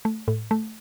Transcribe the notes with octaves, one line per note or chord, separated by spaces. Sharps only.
A3
A2
A3